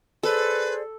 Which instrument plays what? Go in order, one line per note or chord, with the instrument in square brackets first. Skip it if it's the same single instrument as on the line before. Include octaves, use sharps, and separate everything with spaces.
[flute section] G#4 C5 D5 [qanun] A4 [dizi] B4